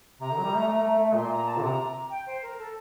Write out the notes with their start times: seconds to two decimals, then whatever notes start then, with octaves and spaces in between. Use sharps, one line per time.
0.20 C3 A#5
0.32 D3
0.38 F#3
0.43 G3
0.55 A3
0.67 A3
0.83 A3
0.99 A3
1.14 A#2 C6
1.31 A#5
1.46 A5
1.57 D3
1.62 C3 A#5
2.10 G5
2.26 C5
2.42 A#4
2.58 A4